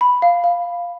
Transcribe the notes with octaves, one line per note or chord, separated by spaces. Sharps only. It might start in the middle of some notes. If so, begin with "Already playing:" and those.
B5
F5
F5